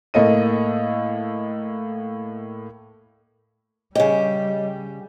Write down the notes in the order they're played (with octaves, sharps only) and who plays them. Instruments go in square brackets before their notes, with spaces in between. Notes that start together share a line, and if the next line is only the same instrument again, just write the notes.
[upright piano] A2 A#3 A4 D#5 D#7
[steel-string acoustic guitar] C#3 G4 [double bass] G3 [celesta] C#5 D#5